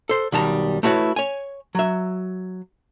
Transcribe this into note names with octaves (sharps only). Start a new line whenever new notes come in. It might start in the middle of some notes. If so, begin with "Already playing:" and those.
A4 C5
B1 D#3 G3 A5 A#5
A3 E4 F#4 B4 C#5
C#5 G#5
F#3 E5